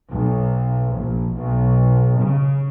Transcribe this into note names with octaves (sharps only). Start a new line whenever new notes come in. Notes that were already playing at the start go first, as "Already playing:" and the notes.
B1
A#1
B1
C#3